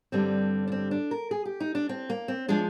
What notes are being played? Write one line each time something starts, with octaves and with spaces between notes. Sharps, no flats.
G2 D3 G3 C4
D4
C4
D4
A#4
G#4
G4
D#4
D4
C4
A#3
C4
F3 G#3 D4